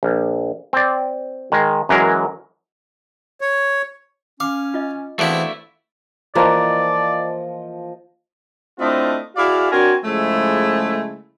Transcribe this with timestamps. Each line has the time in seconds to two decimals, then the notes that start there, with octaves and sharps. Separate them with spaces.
0.03 A#1
0.73 C4 D5
1.52 D#3 G#3
1.89 F#2 E3 F#3 G#3 A#4
3.41 C#5
4.40 C#4 F5 D6
4.74 F4 D#5
5.19 E2 A3 C4 D4 E4 F#4 C5 F5
6.35 E3 F3 A#3 F4 D5 D#5
8.80 A3 C4 D4 E4 F4 D#5
9.36 E4 F#4 G#4 D5 F5
9.71 C4 D4 F#4 A#4 C#5 G#5
10.04 C#3 F3 G#3 A3 E4